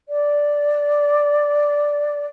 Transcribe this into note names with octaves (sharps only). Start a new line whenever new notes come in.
D5